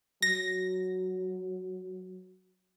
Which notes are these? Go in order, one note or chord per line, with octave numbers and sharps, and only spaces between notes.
F#3 A#6